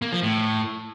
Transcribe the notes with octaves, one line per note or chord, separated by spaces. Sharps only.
A#3
F3
A2